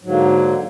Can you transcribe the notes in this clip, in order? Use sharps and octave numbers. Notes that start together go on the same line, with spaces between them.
G#2 D3 F#3 A#3